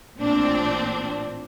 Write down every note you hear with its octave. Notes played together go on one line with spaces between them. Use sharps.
A1 A#2 C4 D4